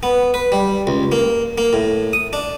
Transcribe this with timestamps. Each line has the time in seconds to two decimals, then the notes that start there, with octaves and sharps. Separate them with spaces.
0.03 B3
0.34 B4
0.52 G3
0.87 C#2
1.12 A#3
1.58 A#3
1.73 A2
2.13 D#6
2.33 D4